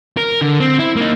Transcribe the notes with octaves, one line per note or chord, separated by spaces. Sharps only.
A#4
D3
C4
E4
A#3 D#4